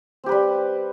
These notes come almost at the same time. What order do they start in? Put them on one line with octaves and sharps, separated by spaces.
C4 G4 B4 G3